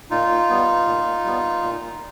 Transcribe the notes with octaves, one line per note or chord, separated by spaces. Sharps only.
A#2 D#4 F4
G3 B3
A#2
G3 B3
A#2